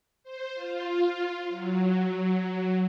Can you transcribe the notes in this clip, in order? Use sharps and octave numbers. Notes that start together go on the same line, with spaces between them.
C5
F4
F#3